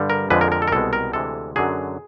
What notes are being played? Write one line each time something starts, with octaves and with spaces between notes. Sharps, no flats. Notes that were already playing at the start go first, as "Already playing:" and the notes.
Already playing: G2 D3 G3
A#4
F2 D3 F3 G#3 B4
A#4
A#4
A4
A#4
C2 B2 G#3 A4
A#4
D2 C3 E3 G#3 A4
F#2 D3 F#3 G#4